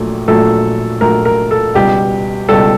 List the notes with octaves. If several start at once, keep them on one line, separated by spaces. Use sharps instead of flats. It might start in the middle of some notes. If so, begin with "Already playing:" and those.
Already playing: A#1 A#2 F#3 A3
A#1 A#2 F#3 A3 A4
A#1 A#2 F#3 A3 A#4
A#4
A4
C#2 B2 G3 G4
C#2 B2 G3 A4